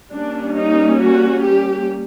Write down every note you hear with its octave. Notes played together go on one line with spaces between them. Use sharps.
G3 A#3 C#4 D4
D#4
F#4
G4